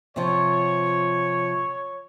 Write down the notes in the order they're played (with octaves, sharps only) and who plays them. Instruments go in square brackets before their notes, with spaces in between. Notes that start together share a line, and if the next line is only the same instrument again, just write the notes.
[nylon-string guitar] C3 F3 [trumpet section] C#5